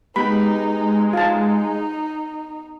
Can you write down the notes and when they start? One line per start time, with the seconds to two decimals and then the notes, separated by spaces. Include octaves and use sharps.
0.16 G#3 B3 D#4 G4 B4 B5
1.13 D#4 F4 A5